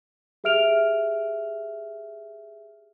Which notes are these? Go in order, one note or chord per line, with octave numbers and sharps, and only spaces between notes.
G4 G#4 E5 F6 D7 F7